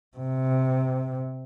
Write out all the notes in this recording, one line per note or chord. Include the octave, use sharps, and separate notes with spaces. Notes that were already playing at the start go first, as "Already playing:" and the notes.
C3